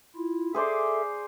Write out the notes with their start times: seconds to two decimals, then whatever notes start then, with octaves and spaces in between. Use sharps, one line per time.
0.16 E4 F4
0.55 G#4 A4 C5 D5 E5